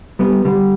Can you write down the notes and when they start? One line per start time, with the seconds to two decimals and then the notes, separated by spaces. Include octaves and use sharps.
0.19 G3 B3
0.45 D3 G3